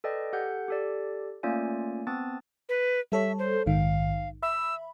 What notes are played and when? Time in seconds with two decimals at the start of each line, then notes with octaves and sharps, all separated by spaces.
0.04 A4 B4 D5 D#5 G5
0.33 G4 A4 F#5 G6
0.68 G4 A4 D5
1.43 A3 A#3 C#4 F4 D5 G#5
2.07 B3 C4 A5 D#6 A6
2.69 B4
3.12 G3 A4 C#5 E5
3.39 C5
3.66 A#1 G#2 D#3 F5
4.42 E5 B5 E6